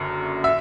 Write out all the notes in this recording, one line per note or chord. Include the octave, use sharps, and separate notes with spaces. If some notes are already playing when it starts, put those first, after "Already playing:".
Already playing: F#1 F#2 D3
E5 E6